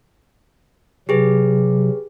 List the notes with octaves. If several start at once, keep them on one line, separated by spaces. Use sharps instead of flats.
C3 F#3 G4 G#4 B4